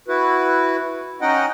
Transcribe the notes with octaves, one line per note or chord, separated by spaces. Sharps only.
E4 F#4 B4
C#4 D#4 D#5 F#5 G5